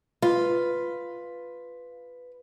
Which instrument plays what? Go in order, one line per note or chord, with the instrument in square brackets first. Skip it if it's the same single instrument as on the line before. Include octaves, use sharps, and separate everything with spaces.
[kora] F4 [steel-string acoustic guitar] B4